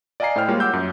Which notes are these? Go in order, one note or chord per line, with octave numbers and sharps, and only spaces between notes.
D5 D#5 F5 G#5 A#5 C7
A2 E4 C5 G5 F6
G3 G#3 A#3 F4 C#5
F#5 D6 E6 G6
F#2